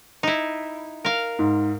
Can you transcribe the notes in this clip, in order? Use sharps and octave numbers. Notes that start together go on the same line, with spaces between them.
D#4 E4
A#4 F5
G#2